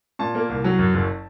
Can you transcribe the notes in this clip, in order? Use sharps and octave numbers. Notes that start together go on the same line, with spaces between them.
A#2 A5
A#3
C2
F#3
F#2
F#1